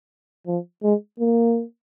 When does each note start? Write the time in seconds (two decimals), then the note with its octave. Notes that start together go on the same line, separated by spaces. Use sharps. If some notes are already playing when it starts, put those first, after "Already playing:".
0.47 F3
0.83 G#3
1.20 A#3